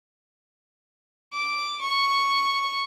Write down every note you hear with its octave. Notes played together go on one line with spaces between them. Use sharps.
D6
C#6